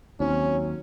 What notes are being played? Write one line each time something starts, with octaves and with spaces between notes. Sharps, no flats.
D#2 F#3 C4 C#4 D#4